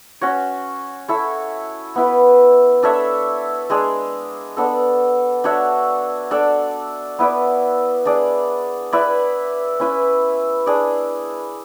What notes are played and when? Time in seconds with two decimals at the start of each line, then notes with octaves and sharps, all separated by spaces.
0.21 C#4 F#4 C#5
1.08 E4 A4 C#5
1.95 B3 E4 B4
2.83 D4 A4 C#5 E5
3.70 G#3 D4 G#4
4.57 B3 D4 A4
5.44 D4 F#4 C#5 E5
6.31 D4 A4 D5
7.19 B3 E4 B4 D5
8.05 D4 G#4 D5
8.92 E4 B4 D5
9.80 C#4 E4 B4
10.66 D4 G#4 D5